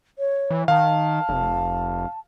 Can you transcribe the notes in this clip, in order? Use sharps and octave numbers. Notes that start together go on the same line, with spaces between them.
C#5
E3
D#3 F5 A5
F1